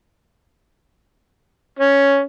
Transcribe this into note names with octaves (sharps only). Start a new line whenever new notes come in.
C#4